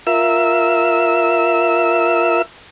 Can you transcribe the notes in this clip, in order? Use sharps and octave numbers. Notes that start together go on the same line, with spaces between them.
F4 A#4 E5 E6